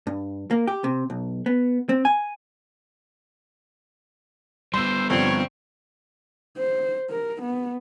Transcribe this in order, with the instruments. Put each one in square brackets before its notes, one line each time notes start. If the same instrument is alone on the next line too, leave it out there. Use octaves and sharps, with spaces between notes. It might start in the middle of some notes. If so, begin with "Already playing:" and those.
[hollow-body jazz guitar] G2
A#3
G4
C3
B1
B3
C4
G#5
[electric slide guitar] G3 B3 [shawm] C5 [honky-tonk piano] C6 E6
[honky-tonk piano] G2 D3 F3 [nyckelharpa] C4 C#6 [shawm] C#5
[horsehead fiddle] C5
A#4
B3